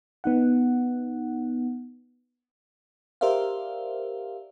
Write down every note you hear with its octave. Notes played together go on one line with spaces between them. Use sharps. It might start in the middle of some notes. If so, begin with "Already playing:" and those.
B3 D#4 F#5
G4 A#4 C5 D5 E5 F5